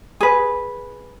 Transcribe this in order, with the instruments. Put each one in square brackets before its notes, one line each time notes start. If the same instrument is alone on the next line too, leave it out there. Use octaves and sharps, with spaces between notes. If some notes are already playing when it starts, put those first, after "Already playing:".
[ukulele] G#4 B4